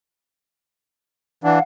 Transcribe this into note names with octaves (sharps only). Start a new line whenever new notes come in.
E3 D4 F5 F#5